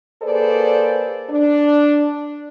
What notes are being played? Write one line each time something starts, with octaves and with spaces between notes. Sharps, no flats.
A#3 G#4 A4 B4 C5 D5
D4